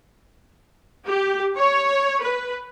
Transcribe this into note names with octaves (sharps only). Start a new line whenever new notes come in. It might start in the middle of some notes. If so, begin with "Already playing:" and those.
G4
C#5
B4